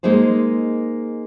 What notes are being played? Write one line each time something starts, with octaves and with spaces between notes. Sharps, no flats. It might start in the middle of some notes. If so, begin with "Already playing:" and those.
G#3 A#3 D#4 G#4 C5